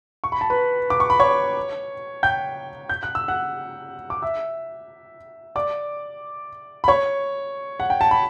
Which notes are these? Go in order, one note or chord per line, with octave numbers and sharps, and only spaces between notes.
C#6
B5
A5
B4 B5
D6
C#6
B5
C#5 C#6
G5 G6
G6
F#6
E6
F#5 F#6
D6
E5 E6
D5 D6
B5
C#5 C#6
F#5
G5
A5
B5